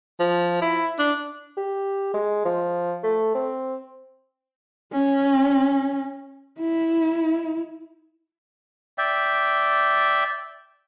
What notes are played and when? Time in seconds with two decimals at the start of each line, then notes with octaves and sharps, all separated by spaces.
0.20 F3
0.62 E4
0.99 D4
1.57 G4
2.14 G#3
2.45 F3
3.03 A3
3.35 C4
4.92 C#4
6.59 E4
8.98 D5 E5 G5